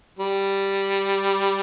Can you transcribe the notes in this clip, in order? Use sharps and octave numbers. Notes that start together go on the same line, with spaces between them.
G3